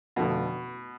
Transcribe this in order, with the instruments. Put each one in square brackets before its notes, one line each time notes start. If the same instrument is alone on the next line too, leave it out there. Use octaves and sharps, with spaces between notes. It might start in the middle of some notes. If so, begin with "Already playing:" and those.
[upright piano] F1 F2 D3 F3 A3 [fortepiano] B2